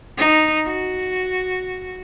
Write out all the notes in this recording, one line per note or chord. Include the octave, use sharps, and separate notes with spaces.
D#4
F#4